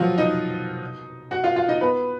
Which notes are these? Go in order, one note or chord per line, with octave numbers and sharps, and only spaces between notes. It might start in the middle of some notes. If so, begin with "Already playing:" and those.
Already playing: F3 F#3 F4 F#4
D#4 D#5
F#4 F#5
F4 F5
F4 F5
D#4 D#5
B3 B4